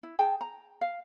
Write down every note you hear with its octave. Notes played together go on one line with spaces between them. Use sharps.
E4
G#4 G5 A5
A#5
F5